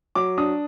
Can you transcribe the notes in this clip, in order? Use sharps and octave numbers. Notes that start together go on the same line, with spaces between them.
F#3 D6
D4 D#6